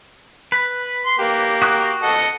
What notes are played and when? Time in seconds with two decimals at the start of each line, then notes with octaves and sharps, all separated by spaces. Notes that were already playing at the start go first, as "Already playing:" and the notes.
0.52 B4
1.06 C6
1.19 A#3 G4
1.62 F#4 D#6 F#6
2.03 A4 D#5 F#5